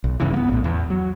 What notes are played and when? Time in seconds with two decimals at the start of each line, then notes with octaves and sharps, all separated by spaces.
0.04 B1
0.20 G2 C#3 E3
0.33 A#3 B3
0.49 A#1 A2
0.64 E2
0.90 F#3